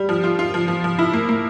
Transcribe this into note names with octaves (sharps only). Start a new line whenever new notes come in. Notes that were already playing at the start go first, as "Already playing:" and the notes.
Already playing: G3
F3
F4
F4
F3
F3
F3
E4
A#3
A#3